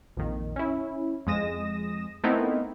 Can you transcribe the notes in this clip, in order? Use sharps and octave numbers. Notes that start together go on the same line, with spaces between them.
A#1 F2 D#3
C#4 E4
F2 G#3 D#6 A#6 E7
A3 B3 C4 D#4 E4 A#4